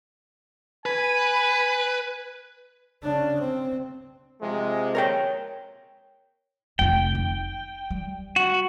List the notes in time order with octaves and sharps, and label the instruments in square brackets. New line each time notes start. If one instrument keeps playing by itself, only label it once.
[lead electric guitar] B4 [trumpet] G#5
[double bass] C#3 D4
C4
[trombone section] C3 F3 G#3
[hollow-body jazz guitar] A#4 C#5 G5
[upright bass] F1 F4 [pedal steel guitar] G5
[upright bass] D#4
G3
[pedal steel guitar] F#4